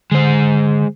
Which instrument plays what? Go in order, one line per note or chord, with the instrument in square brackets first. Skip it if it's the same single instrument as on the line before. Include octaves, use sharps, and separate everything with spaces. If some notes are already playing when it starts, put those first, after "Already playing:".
[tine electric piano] D3 [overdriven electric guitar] G#3 C5